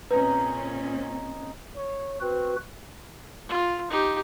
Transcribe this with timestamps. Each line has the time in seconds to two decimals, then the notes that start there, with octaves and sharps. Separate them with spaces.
0.11 A#2 C4 C#4 D#4 G#4 B4 A#5
1.76 C#5
2.21 C4 F#4 B4
3.48 F4
3.90 D#4 G4